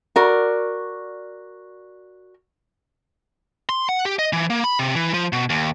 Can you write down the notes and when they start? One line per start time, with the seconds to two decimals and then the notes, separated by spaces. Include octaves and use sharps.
0.16 F#4 A#4 D5
3.69 C6
3.89 F#5
4.05 G4
4.19 D#5
4.33 E3
4.50 A#3
4.64 B5
4.79 C3
4.95 E3
5.14 F3
5.33 B2
5.50 D#2